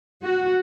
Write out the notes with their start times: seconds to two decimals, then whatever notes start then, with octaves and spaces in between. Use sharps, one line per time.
0.22 F#4